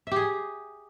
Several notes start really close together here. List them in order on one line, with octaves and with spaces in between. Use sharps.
E5 G4 G#4